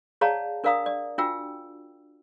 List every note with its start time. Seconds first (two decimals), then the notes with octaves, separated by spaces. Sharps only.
0.21 G#4 C#5 D5 F5 A5 A#5
0.64 D4 A#4 D5 F5 A#5 D#6
0.86 D5
1.18 D4 F4 F#4 G5 E6